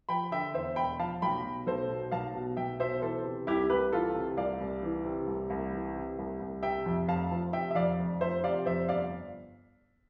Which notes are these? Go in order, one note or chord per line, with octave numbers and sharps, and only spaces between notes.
F3 G5 B5
D3 E5 G5
E2 C5 E5
E1 G5 B5
F3 F5 A5
B1 G5 B5
B2
B1 A4 C5
B2
B1 F5 A5
B2
B1 E5 G5
B2 C5 E5
E3 A4 C5
C3
C2 E4 G4
C2 G4 B4
E3 F4 A4
C3
C2 D5 F5
C2
E3
C3
C2
C2
E3
C3
C2
C2
C3 E5 G5
F2
F1 F5 A5
F3
C3 E5 G5
E5
F2 D5 F5
F1
F3 C5 E5
C3 D5 F5
F2 C5 E5
G1 D5 F5